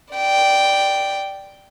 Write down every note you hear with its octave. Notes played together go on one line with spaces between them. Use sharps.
D5 G5